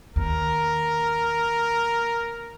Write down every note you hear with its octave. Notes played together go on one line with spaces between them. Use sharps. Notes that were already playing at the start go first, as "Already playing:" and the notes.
D#2 A#4